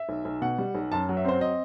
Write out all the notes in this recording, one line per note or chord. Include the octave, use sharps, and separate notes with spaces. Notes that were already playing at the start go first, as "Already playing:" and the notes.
Already playing: E5
B1
B1
B2 F#5
G3
B1
F#2 A5
F#3
E5
C4 C5
D#5